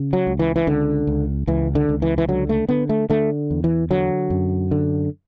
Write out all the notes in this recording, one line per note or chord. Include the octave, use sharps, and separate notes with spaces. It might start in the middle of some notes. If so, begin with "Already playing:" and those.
Already playing: C#3
F#3
C#2
E3
E3
C#2 D3
C#2
C#2 E3
D3
C#2
E3
E3
D3 F#3
A3
D3 B3
A3
D3 A3
E2
E3
D3 F#3
F#2
D3